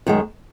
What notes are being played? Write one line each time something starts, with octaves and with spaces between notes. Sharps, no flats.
F#2 D#3 G#3